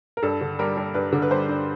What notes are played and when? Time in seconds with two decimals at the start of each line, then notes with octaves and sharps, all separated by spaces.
0.17 A#4
0.23 G2 A4
0.41 D3
0.59 G3 A#4
0.77 G2
0.94 G2 B4
1.13 D3
1.22 B4
1.31 G3 C5
1.49 G2